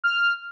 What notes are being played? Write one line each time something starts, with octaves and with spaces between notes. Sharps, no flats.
F6